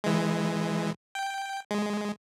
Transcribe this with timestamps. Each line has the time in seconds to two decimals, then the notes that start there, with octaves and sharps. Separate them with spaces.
0.04 E3 G#3
1.15 G5
1.71 G#3